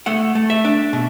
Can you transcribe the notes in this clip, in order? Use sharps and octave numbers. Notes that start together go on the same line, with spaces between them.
A3 F#5
A3
E5
D4
B2